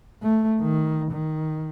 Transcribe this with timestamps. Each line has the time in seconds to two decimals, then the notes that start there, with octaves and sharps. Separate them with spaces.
0.23 A3
0.61 D#3
1.11 D#3